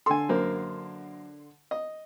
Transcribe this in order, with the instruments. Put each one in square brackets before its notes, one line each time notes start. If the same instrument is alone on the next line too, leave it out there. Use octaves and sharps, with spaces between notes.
[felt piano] D3 C6 [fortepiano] A4 G#5
[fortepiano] F#2 A#3 C5
D#5